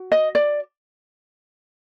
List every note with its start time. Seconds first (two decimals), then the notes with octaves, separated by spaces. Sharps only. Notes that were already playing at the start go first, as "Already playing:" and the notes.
Already playing: F#4
0.12 D#5
0.35 D5